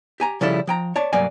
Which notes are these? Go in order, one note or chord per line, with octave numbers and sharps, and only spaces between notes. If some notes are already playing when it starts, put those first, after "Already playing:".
G4 G#5 A#5
C#3 F3 G3 E4 A4
F3 G5 A#5
C#5 D5 A5
C2 G2 F#3 A#3 D5 G#5